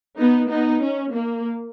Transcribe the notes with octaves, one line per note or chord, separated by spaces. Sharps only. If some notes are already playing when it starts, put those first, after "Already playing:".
B3 D#4
B3 D#4
C#4
A#3